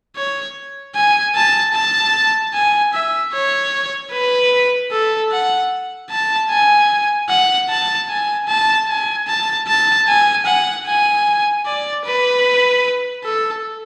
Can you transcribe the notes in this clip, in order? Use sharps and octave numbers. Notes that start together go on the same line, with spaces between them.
C#5
G#5
A5
A5
G#5
E5
C#5
B4
A4
F#5
A5
G#5
F#5
A5
G#5
A5
G#5
A5
A5
G#5
F#5
G#5
D5
B4
A4